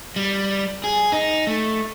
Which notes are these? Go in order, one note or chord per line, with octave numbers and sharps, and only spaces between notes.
G3
G#4
D#4
A3